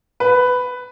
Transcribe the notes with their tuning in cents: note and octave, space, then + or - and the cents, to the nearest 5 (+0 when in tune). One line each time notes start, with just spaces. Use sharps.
B4 +10